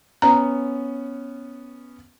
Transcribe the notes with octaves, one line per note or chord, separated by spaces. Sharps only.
B3 C#4 A#5